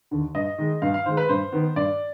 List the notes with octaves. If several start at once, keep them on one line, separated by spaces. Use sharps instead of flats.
D#2 D3
G2 D#5
D#3 G#3
G2 F5
F5
D#3 G#3 C5
B4
G2 C5
D#3 B3
G2 D5